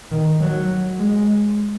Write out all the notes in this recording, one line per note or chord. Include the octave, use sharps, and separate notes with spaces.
D#3
F#3
G#3